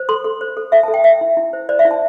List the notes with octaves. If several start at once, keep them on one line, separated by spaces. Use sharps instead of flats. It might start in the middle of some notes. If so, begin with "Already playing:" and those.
Already playing: C5
A4 C6
A4
C5
A4
A4 E5
A5
A4
G5
A4 E5
E4
E4
C5
C5 D5
E5
E4
A5